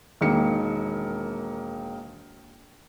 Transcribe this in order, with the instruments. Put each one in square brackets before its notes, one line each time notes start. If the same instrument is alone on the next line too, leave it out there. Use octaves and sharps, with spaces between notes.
[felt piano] E1 D#3 A#3 C#7